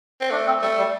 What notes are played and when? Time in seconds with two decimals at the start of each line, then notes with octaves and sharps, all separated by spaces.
0.21 C4
0.31 A3 D4
0.46 C4
0.62 G3 A3
0.78 G3